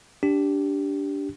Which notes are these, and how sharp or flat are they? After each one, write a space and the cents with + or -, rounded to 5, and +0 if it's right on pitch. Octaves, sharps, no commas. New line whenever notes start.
D4 -15 G4 -5